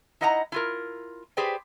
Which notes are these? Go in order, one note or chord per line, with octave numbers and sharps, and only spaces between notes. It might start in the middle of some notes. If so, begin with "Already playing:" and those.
D#4 E4 D#5 F#5 G5 A#5
E4 F4 A#4
G4 G#4 B4 C5 D5 G5